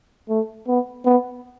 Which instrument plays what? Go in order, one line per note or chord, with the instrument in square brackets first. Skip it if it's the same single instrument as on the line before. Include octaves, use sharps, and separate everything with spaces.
[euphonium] A3
B3
B3